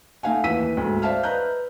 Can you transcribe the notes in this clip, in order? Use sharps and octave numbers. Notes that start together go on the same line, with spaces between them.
A3 D#4 F5 F#5 G#5
D#2 E3 E6 B6 D#7
D2 G#2
C5 D5 E5 F5 A5 F6
B4 D#5 A#5 F#6 G6